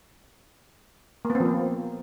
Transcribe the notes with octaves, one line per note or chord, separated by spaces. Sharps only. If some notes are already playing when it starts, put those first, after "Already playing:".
A#3
B3
C4
F3
A#3